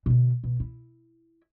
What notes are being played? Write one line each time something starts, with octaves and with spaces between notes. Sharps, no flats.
B2 D3
B2
E4